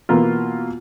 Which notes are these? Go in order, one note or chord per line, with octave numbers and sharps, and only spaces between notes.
B2 E3 A#3 B3 F4